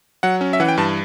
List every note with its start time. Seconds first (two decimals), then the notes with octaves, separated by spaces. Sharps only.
0.23 F#3 F#5
0.41 C#4
0.53 E5
0.60 E3 F#5
0.68 G5
0.77 G2 A5